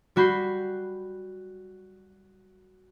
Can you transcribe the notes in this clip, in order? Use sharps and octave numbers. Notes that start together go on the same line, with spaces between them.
G3 F#4 B5 G6 C7